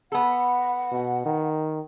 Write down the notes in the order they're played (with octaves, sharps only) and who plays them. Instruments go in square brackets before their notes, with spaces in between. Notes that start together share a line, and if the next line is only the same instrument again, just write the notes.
[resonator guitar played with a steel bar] B3 A4 [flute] F#5
[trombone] B2
D#3